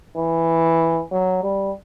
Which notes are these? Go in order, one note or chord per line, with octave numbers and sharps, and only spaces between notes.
E3
F#3
G3